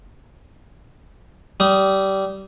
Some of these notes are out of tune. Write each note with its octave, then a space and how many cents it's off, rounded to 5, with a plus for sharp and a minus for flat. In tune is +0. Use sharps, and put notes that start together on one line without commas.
G3 -20 D#6 +0